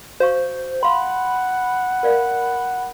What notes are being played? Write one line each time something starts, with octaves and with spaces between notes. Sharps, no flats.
F#4 C5 F5 C#6
F5 F#5 B5 C6
A#4 D5 F5